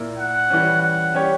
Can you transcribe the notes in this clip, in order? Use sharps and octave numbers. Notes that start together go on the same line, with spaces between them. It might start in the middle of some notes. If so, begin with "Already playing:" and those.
Already playing: A#2 A#3 E4
F#5
E3 G3 C#4
F#5
G3 C#4 G4 C#5